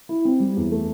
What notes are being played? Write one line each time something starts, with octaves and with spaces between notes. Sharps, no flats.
E4
C4
G3
E2
A3